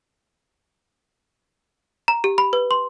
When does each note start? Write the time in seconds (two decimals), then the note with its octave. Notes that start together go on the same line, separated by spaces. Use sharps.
2.08 A#5
2.24 G4
2.38 B5
2.53 B4
2.71 C6